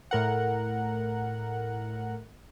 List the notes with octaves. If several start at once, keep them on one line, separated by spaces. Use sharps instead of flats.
A2 A#4 F#5